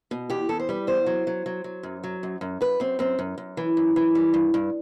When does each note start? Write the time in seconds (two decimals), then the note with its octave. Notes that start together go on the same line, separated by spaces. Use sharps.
0.11 B2
0.30 E2 G4
0.49 E2 A4
0.60 C5
0.69 G3 B4
0.87 E2 C5
1.06 F#3
1.27 F#3
1.46 F#3
1.64 F#3
1.83 F#2
2.04 F#3
2.23 F#2
2.41 F#2
2.61 F#2 B4
2.80 F#2 C4
2.99 F#2 C4
3.19 F#2
3.38 F#2
3.57 E3
3.77 F#2
3.96 E3
4.15 G3
4.34 G2
4.54 G2